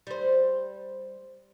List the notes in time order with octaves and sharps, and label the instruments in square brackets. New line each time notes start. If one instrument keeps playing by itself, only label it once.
[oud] G3 C5